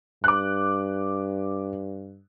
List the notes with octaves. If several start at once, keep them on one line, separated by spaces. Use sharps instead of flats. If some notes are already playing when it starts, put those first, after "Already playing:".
G2 D6 F#6